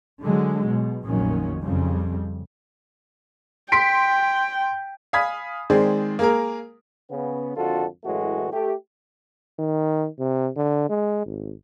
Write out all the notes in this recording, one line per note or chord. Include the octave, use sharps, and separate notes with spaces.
D3 F#3 G#3
B2
F1 A#1 A#2 D#3 F#3 C#4
F2 C#3 G3
G5 C6 B6 D7
F5 G#5 B5 D#6 G#6 B6
D#3 G#3 C4 G#4 D5
A#3 G#4 A#4
C#3 B3
G#1 F2 D3 F4 F#4 A4
F#2 A2 E3 G#3 A3 F#4
A3 G4
D#3
C3
D3
G#3
G#1